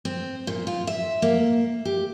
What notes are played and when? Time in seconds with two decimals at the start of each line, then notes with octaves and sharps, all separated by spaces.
0.05 C4
0.47 A#2
0.67 F4
0.87 E5
1.22 A#3
1.85 G4